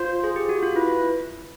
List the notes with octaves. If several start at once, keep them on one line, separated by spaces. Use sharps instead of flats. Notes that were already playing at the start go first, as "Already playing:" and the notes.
Already playing: F4 C5
G#4
G4
F#4
F4
E4 B4